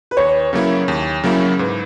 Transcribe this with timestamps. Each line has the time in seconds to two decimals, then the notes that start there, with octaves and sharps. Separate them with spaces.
0.11 B4
0.17 D#2 C#5
0.53 C#3 F#3 A#3 E4
0.88 D#2
1.24 C#3 F#3 A#3 E4
1.59 G#2 B4